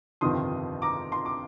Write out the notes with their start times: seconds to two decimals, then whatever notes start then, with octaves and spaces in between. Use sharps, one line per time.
0.21 G1 F2 C3 D#3 C6 D#6
0.82 A#5 D6
1.12 C6
1.26 D6